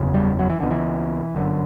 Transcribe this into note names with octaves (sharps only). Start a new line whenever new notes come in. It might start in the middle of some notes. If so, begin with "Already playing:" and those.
Already playing: F#1 E2 C#3
G3
F#3
E3
C#2 B2 D3
E3
G1 F#2 D3